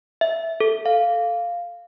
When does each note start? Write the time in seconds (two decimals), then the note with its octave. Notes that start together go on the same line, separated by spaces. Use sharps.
0.21 E5
0.60 A4
0.86 F5